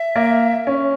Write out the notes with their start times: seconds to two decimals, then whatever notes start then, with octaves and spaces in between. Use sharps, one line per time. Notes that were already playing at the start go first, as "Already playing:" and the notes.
Already playing: E5
0.16 A#3
0.67 C#4